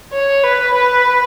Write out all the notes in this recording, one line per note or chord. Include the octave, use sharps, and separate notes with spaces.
C#5
B4
B4